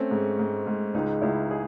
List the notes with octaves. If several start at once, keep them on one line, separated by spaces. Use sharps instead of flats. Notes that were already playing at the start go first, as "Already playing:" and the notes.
Already playing: A3 C4 C#4
G#2
G#2
G#2
C#2 D#4
C#2 E4
G#4